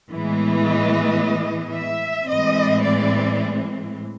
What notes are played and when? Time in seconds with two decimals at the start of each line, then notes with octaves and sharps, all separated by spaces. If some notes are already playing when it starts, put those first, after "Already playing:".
0.11 A2 E3 G#3 B3
0.65 D#5
1.73 E5
2.27 A2 E3 G#3 C4 D#5
2.82 D5